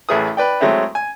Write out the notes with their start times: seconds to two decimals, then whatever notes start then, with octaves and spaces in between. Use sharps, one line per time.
0.09 A1 A3 G#4 B4 D#6
0.37 B4 D5 G5
0.61 F#3 G#3 A3 C4 E4
0.95 G#5